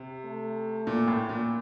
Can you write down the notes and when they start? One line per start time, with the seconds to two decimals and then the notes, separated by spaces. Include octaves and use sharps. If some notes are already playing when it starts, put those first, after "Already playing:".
Already playing: C3
0.25 A3
0.87 A#2
1.08 A2
1.29 A#2